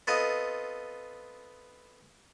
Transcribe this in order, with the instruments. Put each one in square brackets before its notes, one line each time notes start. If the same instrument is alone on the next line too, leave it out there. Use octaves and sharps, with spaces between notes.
[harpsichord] B3 C4 F4 A4 D#5